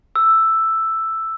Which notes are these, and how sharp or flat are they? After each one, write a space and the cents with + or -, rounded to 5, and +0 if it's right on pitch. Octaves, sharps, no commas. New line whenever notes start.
E6 +5